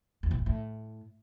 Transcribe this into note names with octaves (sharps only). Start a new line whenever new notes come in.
E2
A#2
F#2
A2